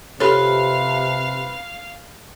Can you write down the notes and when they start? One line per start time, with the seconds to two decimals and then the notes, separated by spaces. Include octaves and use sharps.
0.20 C3 F4 G4 A4 B4 C#5 E5 F5